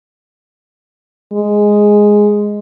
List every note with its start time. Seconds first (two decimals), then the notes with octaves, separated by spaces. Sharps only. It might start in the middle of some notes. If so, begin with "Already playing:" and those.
1.33 G#3